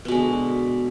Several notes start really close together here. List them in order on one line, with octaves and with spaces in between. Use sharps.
B3 B2 G#3 D3